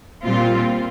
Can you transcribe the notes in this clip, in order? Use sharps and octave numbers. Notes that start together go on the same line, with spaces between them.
A#2 G3 C4 F4